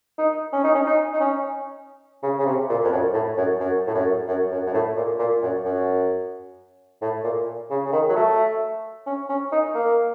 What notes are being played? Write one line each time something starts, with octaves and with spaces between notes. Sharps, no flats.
D#4
C#4
D#4
C#4
D#4
D#4
C#4
C#3
C#3
C3
A#2
F2
F#2
A2
F#2
F#2
A2
F#2
F#2
F#2
F#2
A2
A#2
A#2
F#2
F#2
A2
A#2
C#3
C#3
D#3
F#3
A3
C#4
C#4
D#4
A#3